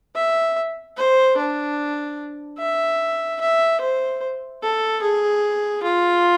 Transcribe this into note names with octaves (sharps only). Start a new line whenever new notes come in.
E5
C5
D4
E5
E5
C5
A4
G#4
F4